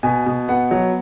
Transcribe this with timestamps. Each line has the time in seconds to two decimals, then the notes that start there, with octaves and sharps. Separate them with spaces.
0.03 B2 G#5
0.26 B2
0.48 B3 F#5
0.71 F#3